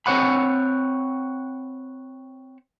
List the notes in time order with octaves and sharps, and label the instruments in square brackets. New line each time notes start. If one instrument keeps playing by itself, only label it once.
[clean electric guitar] C4 C5 C#5 F#5 B5